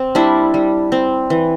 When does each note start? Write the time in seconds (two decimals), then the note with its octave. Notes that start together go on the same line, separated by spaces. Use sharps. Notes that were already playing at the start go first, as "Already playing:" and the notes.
Already playing: C4
0.15 G3 D4 E4
0.54 G3
0.92 C4
1.30 E3